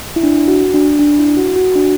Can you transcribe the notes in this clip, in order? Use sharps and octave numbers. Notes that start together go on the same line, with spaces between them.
E4
D4
F#4
D4
D4
E4
F#4
F#4
D4